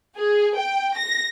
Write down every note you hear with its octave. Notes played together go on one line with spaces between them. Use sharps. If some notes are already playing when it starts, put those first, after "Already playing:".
G#4
G5
A#6